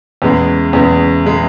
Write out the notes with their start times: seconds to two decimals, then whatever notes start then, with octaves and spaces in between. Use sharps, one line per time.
0.22 E2 C#3 G#3
0.73 E2 C#3 G#3
1.26 C#3 G#3